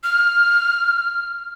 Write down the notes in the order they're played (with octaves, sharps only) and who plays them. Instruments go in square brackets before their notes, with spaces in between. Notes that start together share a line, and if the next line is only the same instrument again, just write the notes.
[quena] F6